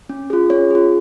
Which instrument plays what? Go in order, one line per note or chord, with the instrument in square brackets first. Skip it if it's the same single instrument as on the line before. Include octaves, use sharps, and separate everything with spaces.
[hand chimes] C#4
F4 G#4
C#4 C#5
F4 G#4